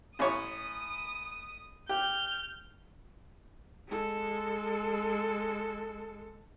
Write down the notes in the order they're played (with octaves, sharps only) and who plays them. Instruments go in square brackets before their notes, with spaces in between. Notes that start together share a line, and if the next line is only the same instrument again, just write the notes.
[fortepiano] A1 C#5 [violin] D#6
[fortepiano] G4 [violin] F6 G6
[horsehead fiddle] G#3 A4